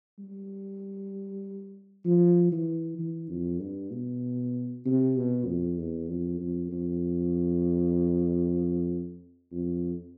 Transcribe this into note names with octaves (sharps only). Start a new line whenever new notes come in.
G3
F3
E3
E3
F2
G2
B2
C3
B2
F2
E2
F2
F2
F2
F2